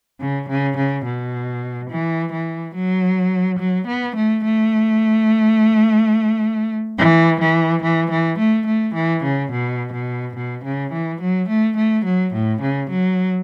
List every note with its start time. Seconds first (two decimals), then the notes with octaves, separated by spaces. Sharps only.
0.21 C#3
0.49 C#3
0.77 C#3
1.05 B2
1.90 E3
2.32 E3
2.75 F#3
3.59 F#3
3.87 B3
4.16 A3
4.44 A3
6.98 E3
7.41 E3
7.83 E3
8.11 E3
8.39 A3
8.67 A3
8.95 E3
9.24 C#3
9.52 B2
9.93 B2
10.36 B2
10.64 C#3
10.93 E3
11.21 F#3
11.49 A3
11.77 A3
12.05 F#3
12.34 A2
12.61 C#3
12.90 F#3